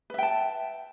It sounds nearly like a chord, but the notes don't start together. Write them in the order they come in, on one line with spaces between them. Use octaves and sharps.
B4 E5 G5 A5